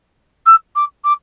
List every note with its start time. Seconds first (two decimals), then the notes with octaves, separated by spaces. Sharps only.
0.46 E6
0.75 D6
1.04 D6